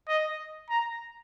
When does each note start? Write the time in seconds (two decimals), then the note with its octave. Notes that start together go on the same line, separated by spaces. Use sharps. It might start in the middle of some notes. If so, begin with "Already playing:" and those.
0.08 D#5
0.70 A#5